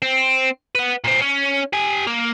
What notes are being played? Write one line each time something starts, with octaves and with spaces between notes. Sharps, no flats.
C4
B4 F#5
A#2 C4
C#4
G4 G#5
A#3